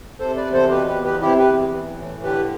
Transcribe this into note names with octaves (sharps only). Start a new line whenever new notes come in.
C3 A4 C5
B4 D5
E2
A4 C5
B2 G4 B4
G4 B4
E2
G4 B4
C3 E4 G4
G4 B4
E2
E3
A2
D3 G4 B4